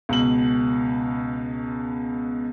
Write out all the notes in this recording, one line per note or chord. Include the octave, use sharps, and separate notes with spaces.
C#2 B2 F#7